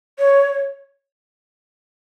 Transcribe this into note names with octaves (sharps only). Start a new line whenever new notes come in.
C#5